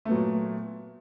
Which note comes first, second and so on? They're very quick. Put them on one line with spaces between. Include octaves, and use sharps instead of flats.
A3 B3 F#3 A#2